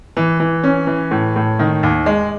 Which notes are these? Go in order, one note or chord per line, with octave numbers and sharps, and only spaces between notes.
E3
E3
C#4
E3
A2
A2
D#3
D#2
G#3